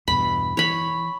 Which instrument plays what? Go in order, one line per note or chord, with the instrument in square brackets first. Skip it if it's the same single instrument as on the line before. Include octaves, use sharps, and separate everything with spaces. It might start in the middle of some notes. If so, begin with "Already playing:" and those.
[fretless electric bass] E2 G2 B2 [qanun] B5
[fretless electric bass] E3 [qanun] C#5 B5